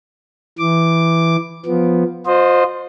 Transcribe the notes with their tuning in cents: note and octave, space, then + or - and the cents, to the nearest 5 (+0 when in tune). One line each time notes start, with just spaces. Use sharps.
E3 +0 D6 +0
F3 +5 B3 +0
F4 +40 C5 +0 D#5 -15